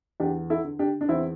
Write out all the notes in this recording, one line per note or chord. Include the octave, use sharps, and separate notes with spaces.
E2 D4 G4
E4 A4
D3
D4 G4
D4
E2 C4 E4